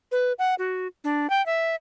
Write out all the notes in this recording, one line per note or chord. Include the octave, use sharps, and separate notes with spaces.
B4
F#5
F#4
D4
G5
E5